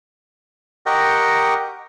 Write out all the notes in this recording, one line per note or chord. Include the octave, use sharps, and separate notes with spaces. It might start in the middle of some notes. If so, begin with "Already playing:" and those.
G4 A#4 D#5 F#5 G5 C#6